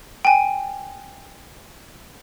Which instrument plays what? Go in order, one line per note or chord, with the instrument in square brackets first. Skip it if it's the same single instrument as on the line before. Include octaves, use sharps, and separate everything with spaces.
[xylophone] G5 G#5